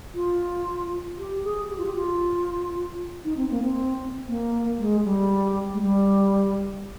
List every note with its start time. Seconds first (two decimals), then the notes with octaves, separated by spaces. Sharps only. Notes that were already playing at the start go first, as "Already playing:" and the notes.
0.15 F4
1.18 G4
1.44 G#4
1.70 G4
1.78 F4
1.86 G4
1.96 F4
3.25 D#4
3.37 C4
3.51 A#3
3.63 C4
4.28 A#3
4.78 G#3
5.05 G3
5.74 G#3
5.82 G3